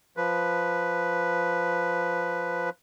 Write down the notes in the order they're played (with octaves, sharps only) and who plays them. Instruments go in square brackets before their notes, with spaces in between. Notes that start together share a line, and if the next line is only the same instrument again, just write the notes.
[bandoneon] F3 B4